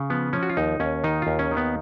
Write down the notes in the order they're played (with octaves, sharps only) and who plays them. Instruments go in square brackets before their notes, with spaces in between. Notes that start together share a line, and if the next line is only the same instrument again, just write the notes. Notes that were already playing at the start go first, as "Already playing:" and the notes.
Already playing: [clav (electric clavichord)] C#3
F3 B3
F3 C#4
F#4
F4
D#2 D#4
D#2 C#4
D#3 D#4
D#2 F4
C#4
D#3
B3